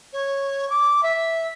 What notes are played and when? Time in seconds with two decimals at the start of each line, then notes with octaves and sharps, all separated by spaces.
0.12 C#5
0.69 D6
1.02 E5